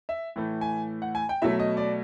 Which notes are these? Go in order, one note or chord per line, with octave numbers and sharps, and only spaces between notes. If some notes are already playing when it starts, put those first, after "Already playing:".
E5
A2 E3 A3
G#5
F#5
G#5
G5
B2 F#3 A3 E5
D#5
D5